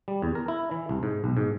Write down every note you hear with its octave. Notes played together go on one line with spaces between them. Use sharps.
G3
E2
A#4
E4
E3
C2
G#2
B1
G#2